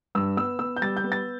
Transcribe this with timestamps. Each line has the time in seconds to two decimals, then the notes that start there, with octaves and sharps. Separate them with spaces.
0.15 G2 E6
0.37 B3 E6
0.59 B3 E6
0.76 G6
0.82 G3 A6
0.97 G6
1.04 B3
1.12 A6